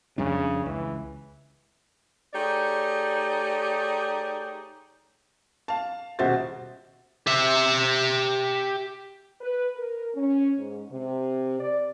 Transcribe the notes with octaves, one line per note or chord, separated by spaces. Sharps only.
F2 C#3 G3 D4
C#2 E3
A3 D#4 G4 G#4 C#5 D5
F5 A5
D#1 B2 F#4 C5 E5 A6
G4 E5
B4
A#4
C#4
G#2
C3
D5